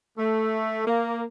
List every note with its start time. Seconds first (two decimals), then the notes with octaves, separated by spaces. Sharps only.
0.18 A3
0.86 A#3